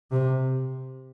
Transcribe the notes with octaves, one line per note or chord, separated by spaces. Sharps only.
C3